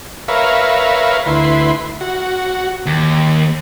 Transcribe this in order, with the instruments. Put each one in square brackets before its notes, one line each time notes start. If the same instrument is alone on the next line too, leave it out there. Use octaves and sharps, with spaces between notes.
[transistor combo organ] A#4 B4 C#5 E5 F5
D2 E4 B4 C6
F#4
[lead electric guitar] D#2